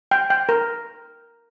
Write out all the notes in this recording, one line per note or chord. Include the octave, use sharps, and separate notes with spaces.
G5
G5
A#4